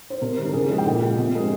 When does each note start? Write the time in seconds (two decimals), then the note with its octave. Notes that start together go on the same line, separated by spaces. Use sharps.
0.10 C5
0.21 C3 A#4
0.38 D#3 G3
0.49 A#4
0.53 C#3 G#4
0.62 G4
0.69 F3 G#3
0.78 G5
0.85 A#2
1.02 G#3
1.18 C3
1.34 F3 G#3